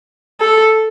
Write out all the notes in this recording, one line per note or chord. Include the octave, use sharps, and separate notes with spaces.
A4